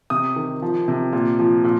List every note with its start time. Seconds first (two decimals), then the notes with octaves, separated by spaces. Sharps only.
0.10 C3 D#6
0.36 D#3
0.62 F3
0.88 C3
1.13 A#2
1.39 F3
1.64 A#2